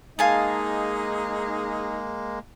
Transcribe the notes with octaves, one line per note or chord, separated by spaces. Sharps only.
G#3 A#3 D#4 G#4 F5 G#5 A5